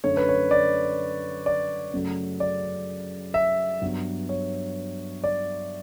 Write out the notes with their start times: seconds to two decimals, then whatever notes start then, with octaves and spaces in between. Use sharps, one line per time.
0.04 F#2 D3 A3 C#5
0.17 B4
0.29 C#5
0.51 D5
1.46 D5
1.93 F#2 C#3 F#3 A3
2.40 D5
3.34 E5
3.82 G2 F#3 B3
4.29 C#5
5.24 D5